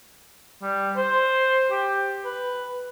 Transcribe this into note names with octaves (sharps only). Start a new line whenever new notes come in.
G3
C5
G4
B4